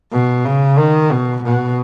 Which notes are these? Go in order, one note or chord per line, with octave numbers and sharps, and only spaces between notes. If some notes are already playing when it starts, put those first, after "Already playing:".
B2
C#3
D#3
B2
B2